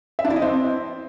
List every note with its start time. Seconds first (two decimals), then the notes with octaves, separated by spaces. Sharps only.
0.19 E5
0.25 D4
0.30 E4
0.36 D#5
0.42 C4